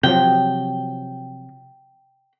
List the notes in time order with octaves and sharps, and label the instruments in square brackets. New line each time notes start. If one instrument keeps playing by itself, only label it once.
[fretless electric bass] C3 F3 F#3 [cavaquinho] G5